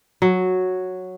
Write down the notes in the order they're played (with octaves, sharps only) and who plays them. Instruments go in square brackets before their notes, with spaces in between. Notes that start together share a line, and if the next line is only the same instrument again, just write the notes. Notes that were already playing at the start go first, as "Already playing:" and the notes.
[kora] F#3